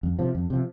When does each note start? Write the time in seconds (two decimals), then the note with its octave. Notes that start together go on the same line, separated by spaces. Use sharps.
0.03 F2
0.19 C3 F3
0.35 F2
0.50 C3 F3